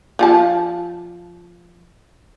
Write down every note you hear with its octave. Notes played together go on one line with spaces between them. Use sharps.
F3 F4 A5